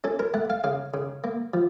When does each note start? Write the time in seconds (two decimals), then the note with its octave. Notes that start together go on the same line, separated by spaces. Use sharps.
0.04 C#4 A4
0.19 A#4
0.34 A3 F#5
0.50 F5
0.64 C#3 F5
0.94 C#3
1.24 A#3
1.54 F3